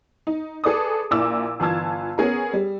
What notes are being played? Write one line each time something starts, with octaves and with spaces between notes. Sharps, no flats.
D#4
G#4 A4 B4 D5 D6 D#6
A#1 A#2 E4 D6 E6
G1 E3 F4 A5 E6 G#6
B3 C#4 G#4 A#4
G3